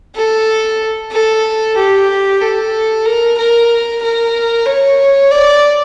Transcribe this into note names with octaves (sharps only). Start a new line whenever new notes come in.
A4
A4
G4
A4
A#4
A#4
A#4
C#5
D5